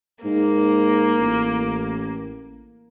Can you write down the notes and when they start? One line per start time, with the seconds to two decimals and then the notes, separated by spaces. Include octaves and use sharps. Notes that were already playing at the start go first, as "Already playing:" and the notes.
0.24 G#2 A#3
1.19 A1